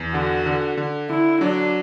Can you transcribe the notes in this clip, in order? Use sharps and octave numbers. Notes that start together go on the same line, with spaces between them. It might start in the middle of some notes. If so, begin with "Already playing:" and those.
Already playing: E2
D3 F#4
D3
D3
D3 E4
F#3 D4